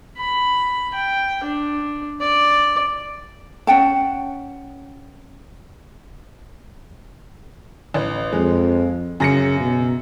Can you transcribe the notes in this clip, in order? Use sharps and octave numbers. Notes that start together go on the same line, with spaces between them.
B5
G5
D4
D5
C#4 F#5 G5 A5
A1
F2 G#3
F#2 C#3 A#6 C#7
B2